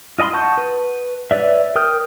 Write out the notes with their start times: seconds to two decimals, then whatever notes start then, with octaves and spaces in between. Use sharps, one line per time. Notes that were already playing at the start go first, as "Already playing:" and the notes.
0.19 F4 D#5 G#5 B5 C6
0.33 F#5 A5 C#6 G6
0.58 B4
1.31 B4 C#5 D5 E5
1.75 A#4 G5 D#6 F6 G6